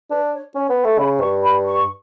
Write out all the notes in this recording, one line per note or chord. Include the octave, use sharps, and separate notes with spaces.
D4 B4
C#5
C#4 C#5
B3
A3
C#3 B5
G2 C#6
B5
C#6